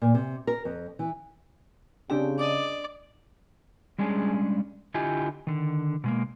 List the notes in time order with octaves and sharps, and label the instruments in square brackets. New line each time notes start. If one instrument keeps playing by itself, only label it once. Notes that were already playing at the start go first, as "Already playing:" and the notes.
[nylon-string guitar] A#2
C3
A#4
F2
E3
[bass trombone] C#3 [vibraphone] C4 G4 [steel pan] D4 G#4 G5
[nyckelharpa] D5 [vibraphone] D#5 D#6
[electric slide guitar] G3 G#3 C#4 D4 G#4
D3 E4 F4 G4 D#5 G#5
D3 D#3
B2 G#3 A#3